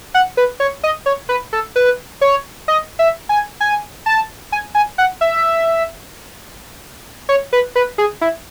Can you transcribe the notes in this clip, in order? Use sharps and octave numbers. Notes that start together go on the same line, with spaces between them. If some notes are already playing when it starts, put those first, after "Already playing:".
F#5
B4
C#5
D#5
C#5
B4
A4
B4
C#5
D#5
E5
G#5
G#5
A5
G#5
G#5
F#5
E5
C#5
B4
B4
G#4
E4